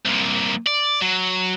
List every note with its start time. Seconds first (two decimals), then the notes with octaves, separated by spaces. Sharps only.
0.06 C2 A#2
0.67 D5
1.02 F#3